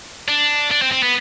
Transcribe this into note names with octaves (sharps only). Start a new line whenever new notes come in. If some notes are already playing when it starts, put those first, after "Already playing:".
D4
D4
C4
C4
B3